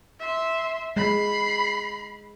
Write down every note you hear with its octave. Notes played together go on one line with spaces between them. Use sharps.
E5 C6
G#3 B5 C7